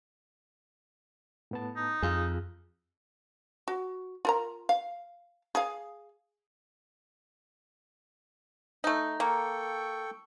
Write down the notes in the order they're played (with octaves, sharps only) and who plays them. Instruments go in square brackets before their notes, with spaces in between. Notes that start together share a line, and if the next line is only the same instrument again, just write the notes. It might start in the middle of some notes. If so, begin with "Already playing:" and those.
[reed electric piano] A2 B3 A5
[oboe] D#4
[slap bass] F2 [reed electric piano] F4 G#4
[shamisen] F#4
F4 A#4 A#5
F5
G#4 F5
[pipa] A3 D#4
[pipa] A#3 [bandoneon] A4 G5 C#6